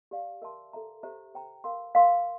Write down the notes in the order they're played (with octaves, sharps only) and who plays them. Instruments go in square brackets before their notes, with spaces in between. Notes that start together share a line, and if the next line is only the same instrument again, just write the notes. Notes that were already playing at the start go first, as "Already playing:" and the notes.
[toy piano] G4 D5 F5
A#4 E5 A5 C6
A4 E5 A#5
G4 C5 E5 A#5
C5 G5 A#5
A#4 F5 C6
A#4 F5 C6